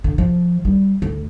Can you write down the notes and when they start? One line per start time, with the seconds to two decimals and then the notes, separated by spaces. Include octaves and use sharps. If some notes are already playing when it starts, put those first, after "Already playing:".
0.04 D3
0.18 F3
0.65 G3
1.02 D2